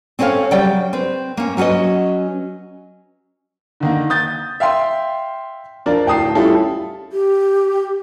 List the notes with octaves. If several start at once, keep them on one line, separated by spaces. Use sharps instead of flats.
C4 C#4 A4 C#5 F5
C#3 F#3 G3 D5 G5
C4 B4
A#3 C#4
F#3 C#4 F#4 B4 D#5
D3 D#3 A#3
D#6 G6 A6
E5 F5 G5 C6
F3 D4 F4 A#4 D5
D1 G5 A5 D#6 C7
G3 C#4 E4 F4 A4
G4